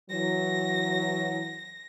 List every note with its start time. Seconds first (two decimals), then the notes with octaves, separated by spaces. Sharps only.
0.10 E3 F#3 A#6